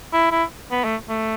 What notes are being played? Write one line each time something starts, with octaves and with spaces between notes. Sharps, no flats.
E4
E4
B3
A3
A3